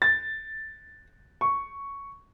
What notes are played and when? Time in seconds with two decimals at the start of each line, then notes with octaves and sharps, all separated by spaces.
0.02 A6
1.41 C#6